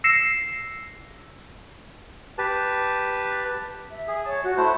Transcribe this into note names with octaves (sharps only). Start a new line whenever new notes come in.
E6 A#6 C7 C#7 E7
G4 B4 A5
E5
G#4
C#5 A5
F#4
A3 E4 C5 A5